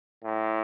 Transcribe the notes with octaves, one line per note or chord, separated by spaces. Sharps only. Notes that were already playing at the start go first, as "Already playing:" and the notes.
A2